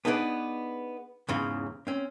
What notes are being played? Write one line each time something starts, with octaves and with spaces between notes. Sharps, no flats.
B3 D4 D#4 G#4 B4 D5
E2 G#2 C#3 E3
C4 C#4